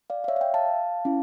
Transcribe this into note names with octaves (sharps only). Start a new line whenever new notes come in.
D5 F5
F5
C#5 E5
F5
E5 G5
F5 A5
C#4 E4